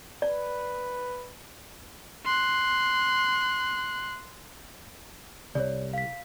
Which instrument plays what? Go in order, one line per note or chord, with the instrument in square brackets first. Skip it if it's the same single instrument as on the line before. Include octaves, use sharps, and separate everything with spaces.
[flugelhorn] B4 [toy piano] D5
[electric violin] C6 F#6
[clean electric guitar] C2 [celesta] C#5 D5
[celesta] F5 B6